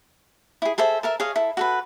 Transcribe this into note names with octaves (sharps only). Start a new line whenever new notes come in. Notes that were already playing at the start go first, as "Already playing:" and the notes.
E4 G#4
G#4 A4 C5 E5
A4 A#4 E5
G#4 C#5 D#5 F5
E4 A4
F#4 A4 B4